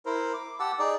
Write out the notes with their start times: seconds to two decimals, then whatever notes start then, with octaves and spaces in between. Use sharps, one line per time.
0.06 E4 A#4 C5
0.34 D6
0.60 G4 F#5 A5 E6
0.79 D#4 G#4 D5